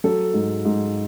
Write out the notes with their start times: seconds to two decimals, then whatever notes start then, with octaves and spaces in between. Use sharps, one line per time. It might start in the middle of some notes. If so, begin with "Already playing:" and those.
0.04 F#3 A4
0.34 G#2
0.65 G#2